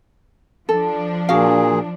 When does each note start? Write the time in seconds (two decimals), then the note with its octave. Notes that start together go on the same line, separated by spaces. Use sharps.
0.69 F3 D4 A4
1.29 A#2 F#4 G#4 F5